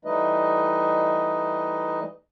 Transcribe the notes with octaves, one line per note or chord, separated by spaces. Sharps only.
E3 G3 A3 D#4 B4 D#5